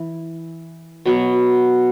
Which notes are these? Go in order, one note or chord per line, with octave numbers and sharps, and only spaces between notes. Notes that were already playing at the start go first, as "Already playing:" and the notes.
Already playing: E3
B2 F#3 B3